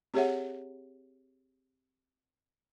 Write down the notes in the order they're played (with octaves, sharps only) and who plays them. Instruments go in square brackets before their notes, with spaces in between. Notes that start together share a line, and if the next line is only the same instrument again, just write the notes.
[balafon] C4 G4 G#4 C#5 E5 F#5